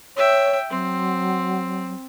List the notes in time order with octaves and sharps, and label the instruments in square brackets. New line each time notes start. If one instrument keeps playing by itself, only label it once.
[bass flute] C#5 [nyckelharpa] E5 G5
[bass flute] F#3 [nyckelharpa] C4